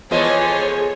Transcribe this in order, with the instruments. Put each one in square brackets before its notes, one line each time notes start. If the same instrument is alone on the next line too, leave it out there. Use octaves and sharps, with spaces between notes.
[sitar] E3 F3 G#3 [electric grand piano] B3 F4 D#5 [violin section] A4 C#5